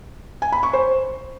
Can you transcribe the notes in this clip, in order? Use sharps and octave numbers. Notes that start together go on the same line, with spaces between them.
G#5
B5
C#6
C5